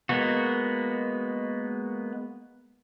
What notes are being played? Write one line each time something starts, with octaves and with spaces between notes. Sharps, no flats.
G#3 A#3 B3 F#4